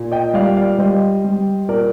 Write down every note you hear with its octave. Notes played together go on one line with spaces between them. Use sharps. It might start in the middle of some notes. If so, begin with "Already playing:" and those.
Already playing: A#2
D#5 G5
G3 D5 F5
D5 F5
G3 C5 D#5
G3
A#2 A#4 D5